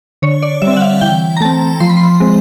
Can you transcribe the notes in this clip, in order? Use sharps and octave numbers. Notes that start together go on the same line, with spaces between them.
D3 C#5
D5
G3 E5
C4
F#5
F5
E3 G5
A#5
A3 C4 A5
F3 C6
B5
C6
G#3 C4